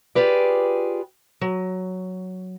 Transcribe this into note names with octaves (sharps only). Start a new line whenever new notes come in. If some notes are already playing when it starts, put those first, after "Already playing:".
F4 G4 G#4 B4 D5
F#3